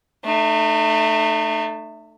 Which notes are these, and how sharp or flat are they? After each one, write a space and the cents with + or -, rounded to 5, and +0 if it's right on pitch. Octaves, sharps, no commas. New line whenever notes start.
A3 +0 D#4 -40